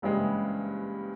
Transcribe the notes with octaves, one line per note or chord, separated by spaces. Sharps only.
F#1 G2 C#3 E3 G3 G#3